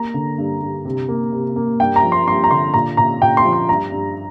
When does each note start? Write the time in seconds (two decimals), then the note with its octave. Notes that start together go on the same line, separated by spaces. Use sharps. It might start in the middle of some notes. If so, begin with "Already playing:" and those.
Already playing: A#3 A#5
0.14 D3
0.38 G2
0.62 G2
0.85 C3
1.08 A#3
1.33 C3
1.56 A#3
1.80 G2 G5
1.96 A#5
2.03 F3
2.12 C6
2.27 G2 C6
2.44 A#5
2.51 D3 C6
2.74 A#2 A#5
2.97 A#2 A#5
3.22 A#2 G5
3.37 C6
3.45 F3
3.53 C6
3.69 G2 A#5
3.92 G2